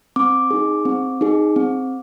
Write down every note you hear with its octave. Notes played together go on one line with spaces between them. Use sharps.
C4 D6
D#4 G#4
C4
D#4 G#4
C4